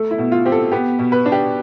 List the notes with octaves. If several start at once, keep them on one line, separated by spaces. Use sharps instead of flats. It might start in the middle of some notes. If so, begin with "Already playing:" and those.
Already playing: A3 A4
E4
B2
F4
C4 G4
A4
B3 G4
B2
B4
D4
G4